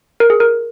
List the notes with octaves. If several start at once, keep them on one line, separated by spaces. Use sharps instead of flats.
A#4
G#4
A#4